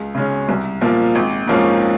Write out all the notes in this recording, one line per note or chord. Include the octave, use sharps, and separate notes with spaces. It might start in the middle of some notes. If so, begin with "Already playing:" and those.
Already playing: C#2
C#3 G#3 C#4
C2
A#2 F3 A#3
G#1
G#2 F3 A#3 C#4